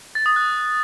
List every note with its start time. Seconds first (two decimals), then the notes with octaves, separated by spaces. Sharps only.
0.15 A6
0.26 D#6
0.36 F#6